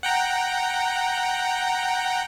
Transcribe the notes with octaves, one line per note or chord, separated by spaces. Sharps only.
F#5 G5 A#5